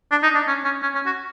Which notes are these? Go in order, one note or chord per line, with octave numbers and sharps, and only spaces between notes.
D4
D#4
D4
C#4
C#4
C#4
C#4
F#4